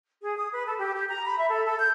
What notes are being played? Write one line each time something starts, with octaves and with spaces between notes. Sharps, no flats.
G#4
D#6
B4
A4
G4
G4
A#5
B5
E5
A4
A4
G6